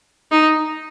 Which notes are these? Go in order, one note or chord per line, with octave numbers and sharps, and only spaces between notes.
D#4